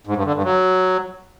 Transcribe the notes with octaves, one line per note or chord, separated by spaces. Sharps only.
G#2
G2
D3
G2
F#3